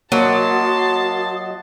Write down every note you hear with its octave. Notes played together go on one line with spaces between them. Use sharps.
F#3 A#3 F#4 D#5 A5 C6